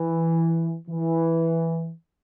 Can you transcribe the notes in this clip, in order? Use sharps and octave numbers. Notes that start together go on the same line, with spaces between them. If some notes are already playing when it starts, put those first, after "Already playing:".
Already playing: E3
E3